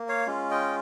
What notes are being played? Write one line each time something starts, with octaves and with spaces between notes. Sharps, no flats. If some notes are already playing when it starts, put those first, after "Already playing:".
Already playing: A#3
C#5 F5
G#3 C#4 F4
D#5 G5